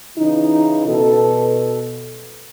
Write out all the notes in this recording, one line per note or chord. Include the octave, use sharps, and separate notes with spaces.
C#3 E3 D#4
B2 A4